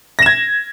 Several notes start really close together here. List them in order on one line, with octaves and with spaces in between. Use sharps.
A#6 E7 G#6